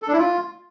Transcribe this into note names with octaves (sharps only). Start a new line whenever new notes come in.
A4
D4
E4
F4